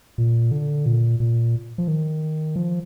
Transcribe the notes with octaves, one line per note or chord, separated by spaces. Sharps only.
A#2
D3
A#2
A#2
F3
D#3
F3